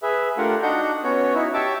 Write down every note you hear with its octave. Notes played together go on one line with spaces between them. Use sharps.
G#4 B4 E5
A3 D4 F4 G4 A#4 F#5
D4 D#4 F#4 F#5 G6
B3 C#4 F#4 C#5
D#4 E4 F#4
G4 C#5 E5 A5 D6 E6